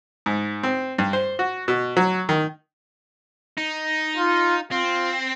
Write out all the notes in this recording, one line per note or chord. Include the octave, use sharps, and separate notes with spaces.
G#2
C4
G2
C5
F#4
B2
F#3
D#3
D#4
F4
C4 F4